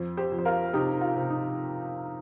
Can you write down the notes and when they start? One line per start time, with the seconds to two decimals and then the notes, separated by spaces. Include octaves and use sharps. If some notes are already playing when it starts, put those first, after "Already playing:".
Already playing: F2
0.17 G4 C5
0.32 F2
0.39 C5
0.45 F4 A#4
0.73 C3 D#4 G4
1.01 F4
1.15 C3
1.30 D#4